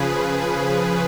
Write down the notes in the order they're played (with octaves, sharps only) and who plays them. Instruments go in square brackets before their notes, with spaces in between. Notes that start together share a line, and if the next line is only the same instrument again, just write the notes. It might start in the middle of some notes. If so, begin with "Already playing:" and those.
Already playing: [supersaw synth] C#3 F3 G#4 B4